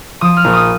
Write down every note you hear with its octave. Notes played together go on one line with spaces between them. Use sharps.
F3 D#6
F6
A#1
D#6